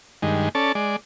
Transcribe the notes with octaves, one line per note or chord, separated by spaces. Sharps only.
G2 D#3 G#3
C#4 A4 D5 A5
G#3 D5